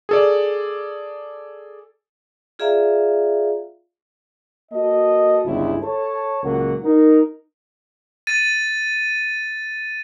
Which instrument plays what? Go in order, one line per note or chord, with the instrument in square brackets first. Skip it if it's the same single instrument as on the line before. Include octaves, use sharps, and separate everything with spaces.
[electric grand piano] G#4 A4 D5
[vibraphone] F4 G#4 D5 E5 F5 A#5
[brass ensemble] A#3 F#4 A4 D#5
G1 C#2 E4
A4 C#5 A5
C#2 A#2 F#3 A#3 A#4 F#5
D#4 A#4
[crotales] A6 D#7